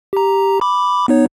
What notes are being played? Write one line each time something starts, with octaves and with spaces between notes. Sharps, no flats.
G4 A#5
B5 D6
B3 D#4 C#5